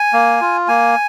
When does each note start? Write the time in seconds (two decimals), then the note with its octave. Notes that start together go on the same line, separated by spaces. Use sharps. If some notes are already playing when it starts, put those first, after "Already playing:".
Already playing: G#5
0.13 A#3
0.41 F4
0.68 A#3 G#5